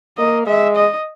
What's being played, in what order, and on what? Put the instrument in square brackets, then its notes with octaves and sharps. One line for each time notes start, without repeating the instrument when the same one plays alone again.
[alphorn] A#3 [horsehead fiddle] D#5
[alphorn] G#3 [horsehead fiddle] E5
[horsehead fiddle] D#5